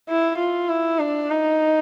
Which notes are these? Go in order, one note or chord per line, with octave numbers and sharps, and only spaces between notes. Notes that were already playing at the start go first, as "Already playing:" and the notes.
E4
F4
E4
D4
D#4